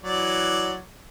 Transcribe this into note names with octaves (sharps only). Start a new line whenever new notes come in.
E3 F#3 D5